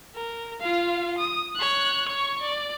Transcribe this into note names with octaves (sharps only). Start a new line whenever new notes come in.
A#4
F4 F5
D#6
C#5 F#6
C#5 C#6
D5